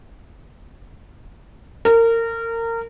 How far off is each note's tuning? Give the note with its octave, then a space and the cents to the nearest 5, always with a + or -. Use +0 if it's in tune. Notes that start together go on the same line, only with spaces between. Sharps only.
A#4 -25